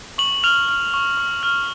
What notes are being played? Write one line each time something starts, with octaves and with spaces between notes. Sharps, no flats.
C#6 F#7
F6 F7
F6
C#6
C#6
F6